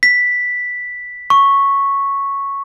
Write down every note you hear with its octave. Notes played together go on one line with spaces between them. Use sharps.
B6
C#6